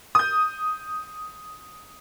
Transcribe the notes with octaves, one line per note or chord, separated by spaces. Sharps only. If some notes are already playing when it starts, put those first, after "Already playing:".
D#6 G6